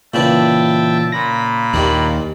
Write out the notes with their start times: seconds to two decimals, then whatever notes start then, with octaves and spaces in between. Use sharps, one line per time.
0.14 A#2 C#3 E3 D4 B4 E5 G5 A5
1.12 A#2 B5 A#6
1.73 D#2 D#3 G3 D4